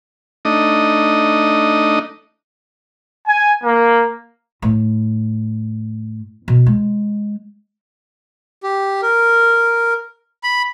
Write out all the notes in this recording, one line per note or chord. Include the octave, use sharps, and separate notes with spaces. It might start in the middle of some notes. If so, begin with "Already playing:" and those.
A3 D4 D#4 D#5
G#5
A#3
A2
B2
G#3
G4
A#4
B5